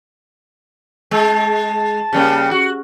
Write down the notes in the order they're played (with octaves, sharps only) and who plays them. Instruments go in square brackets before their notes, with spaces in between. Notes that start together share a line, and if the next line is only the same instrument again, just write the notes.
[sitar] G#3 [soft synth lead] A5
[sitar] C#3 G3 A#3
F#4